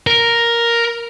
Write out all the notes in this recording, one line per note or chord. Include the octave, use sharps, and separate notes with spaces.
A#4